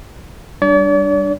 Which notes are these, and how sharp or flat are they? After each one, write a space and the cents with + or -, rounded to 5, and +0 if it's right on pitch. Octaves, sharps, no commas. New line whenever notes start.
G3 +0 D4 +0 D5 -45